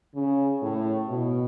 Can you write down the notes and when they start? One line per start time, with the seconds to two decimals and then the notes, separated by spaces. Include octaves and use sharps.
0.15 C#3
0.62 A2
1.09 B2